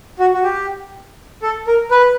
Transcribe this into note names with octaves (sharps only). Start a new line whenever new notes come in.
F#4
F#4
G4
A4
A#4
B4